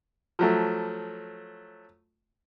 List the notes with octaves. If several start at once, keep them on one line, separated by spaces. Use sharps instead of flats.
F3 F#3 A3